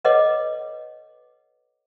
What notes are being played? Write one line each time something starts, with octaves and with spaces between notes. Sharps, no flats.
A4 B4 C#5 D#5 F#5 D6